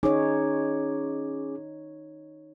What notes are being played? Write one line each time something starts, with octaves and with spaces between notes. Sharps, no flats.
C#4 D#4 G#4 C#5 D6